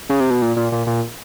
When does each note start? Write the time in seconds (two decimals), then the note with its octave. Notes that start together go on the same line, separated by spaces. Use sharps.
0.10 C#3
0.20 C3
0.31 B2
0.42 A#2
0.57 A#2
0.72 A#2
0.87 A#2